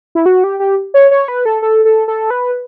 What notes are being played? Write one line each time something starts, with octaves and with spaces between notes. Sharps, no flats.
E4
F#4
G4
G4
C#5
C#5
B4
A4
A4
A4
A4
B4